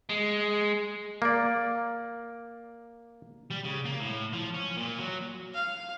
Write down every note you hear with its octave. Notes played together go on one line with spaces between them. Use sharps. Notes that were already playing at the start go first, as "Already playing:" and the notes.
G#3
A#3 D5
G3
C#3
A#3
A2
F3
C#4
A#2
F#3
F5